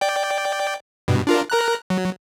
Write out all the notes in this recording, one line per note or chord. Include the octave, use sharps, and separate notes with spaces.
D5 G5
G2 B2
D4 F4 A#4
A#4 A#5 F#6
F#3